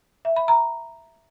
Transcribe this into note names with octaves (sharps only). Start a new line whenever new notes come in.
E5
B5
A#5